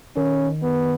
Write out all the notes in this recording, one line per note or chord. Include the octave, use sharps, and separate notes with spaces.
D#3 C#4
B3